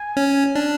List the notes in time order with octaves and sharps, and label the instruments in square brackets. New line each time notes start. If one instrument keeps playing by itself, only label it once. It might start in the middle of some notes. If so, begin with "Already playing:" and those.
Already playing: [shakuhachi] G#5
[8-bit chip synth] C#4
[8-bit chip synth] D4 [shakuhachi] A5